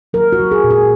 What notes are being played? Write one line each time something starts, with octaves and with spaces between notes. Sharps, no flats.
F#3 A#4
F#4
F#3
G#4
A#2
G#4